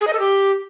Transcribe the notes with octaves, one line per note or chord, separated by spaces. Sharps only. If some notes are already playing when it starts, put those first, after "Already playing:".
G#4
D#5
A4
G4